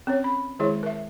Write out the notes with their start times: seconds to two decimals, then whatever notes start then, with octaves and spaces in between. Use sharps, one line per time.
0.07 C4 C#4 C#5
0.24 B5
0.59 D#3 G#3 E4 G#4 C#5
0.83 A#4 E5